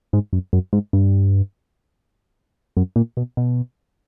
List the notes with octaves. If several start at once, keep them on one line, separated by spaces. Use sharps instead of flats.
G#2
F#2
F#2
G#2
G2
F#2
A#2
B2
B2